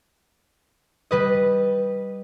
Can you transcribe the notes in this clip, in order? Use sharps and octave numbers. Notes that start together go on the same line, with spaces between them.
G3 B4 D#5